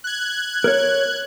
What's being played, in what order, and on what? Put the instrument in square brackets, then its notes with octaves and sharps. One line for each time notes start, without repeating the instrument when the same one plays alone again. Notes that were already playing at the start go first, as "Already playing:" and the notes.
[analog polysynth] F#6 G#6
[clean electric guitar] A#4 C#5